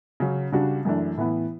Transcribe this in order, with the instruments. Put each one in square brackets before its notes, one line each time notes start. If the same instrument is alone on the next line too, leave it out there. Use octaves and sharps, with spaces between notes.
[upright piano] C#3 F#3 C#4
C#3 G3 D4 F#4
F#2 E3 A3 D4
A2 E3 B3